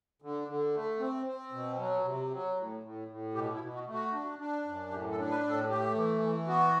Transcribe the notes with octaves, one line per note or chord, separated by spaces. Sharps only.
D3
D3
A3
C4
C4
B2
F#3
C3
F#3
A2
A2
A2
B2 G4
E4
B2
F#4
A3
F#4
D4
D4
F#2
A2 G4
A4
D4
B4
A2
A4
A3 G4
E3
E3
B3 F#4